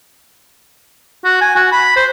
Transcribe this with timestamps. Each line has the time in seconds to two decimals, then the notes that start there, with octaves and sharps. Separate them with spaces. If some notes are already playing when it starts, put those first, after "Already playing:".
1.24 F#4
1.41 G#5
1.56 F#4
1.72 B5
1.96 C5